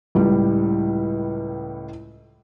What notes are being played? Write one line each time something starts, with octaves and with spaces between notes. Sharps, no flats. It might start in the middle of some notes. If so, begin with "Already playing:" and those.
C#2 A2 G3